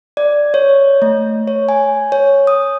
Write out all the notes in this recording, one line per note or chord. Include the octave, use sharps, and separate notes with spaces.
D5
C#5
A3
C#5
G#5
C#5
D#6